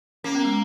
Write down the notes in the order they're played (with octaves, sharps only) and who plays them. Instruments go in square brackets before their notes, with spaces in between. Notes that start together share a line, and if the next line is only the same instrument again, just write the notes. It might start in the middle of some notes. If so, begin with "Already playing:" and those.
[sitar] A#3 [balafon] C#4
[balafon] B3
G#3